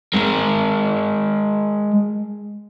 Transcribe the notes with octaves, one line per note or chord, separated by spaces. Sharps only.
G#3 A#4